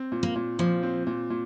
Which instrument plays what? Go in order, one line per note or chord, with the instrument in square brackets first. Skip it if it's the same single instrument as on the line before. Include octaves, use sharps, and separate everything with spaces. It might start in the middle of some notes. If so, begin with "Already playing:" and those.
Already playing: [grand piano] C4
A#2
[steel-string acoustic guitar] A#3
[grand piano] A#2
[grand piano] A#2 [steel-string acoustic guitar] F3
[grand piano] C4
A#2
A#2